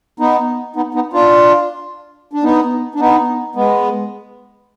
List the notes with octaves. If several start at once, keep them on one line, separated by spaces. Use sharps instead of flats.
B3 D#4
B3 D#4
B3 D#4
D4 F4
D4
B3 D#4
D4
B3 D#4
G#3 B3